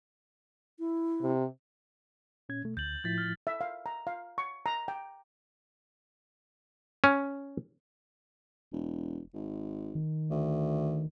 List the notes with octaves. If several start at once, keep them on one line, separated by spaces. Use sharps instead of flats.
E4
C3
A#2 C#4 G#6
B2 A3
D2 G6 A6 F#7
A2 F3 E4 G6 A6 B6
F6
E5
F5
A#5
F5
C#6
A#5
G5
C#4
E1
G#1
D#3
D2